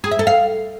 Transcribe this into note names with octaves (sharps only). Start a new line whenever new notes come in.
G#4
E5
A4
F5